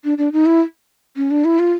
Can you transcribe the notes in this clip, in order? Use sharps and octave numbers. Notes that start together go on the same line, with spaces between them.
D4
D4
D#4
E4
C#4
D4
E4
F4